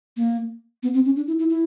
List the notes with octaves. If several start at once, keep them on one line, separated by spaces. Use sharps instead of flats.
A#3
B3
C4
C#4
D4
E4
E4
E4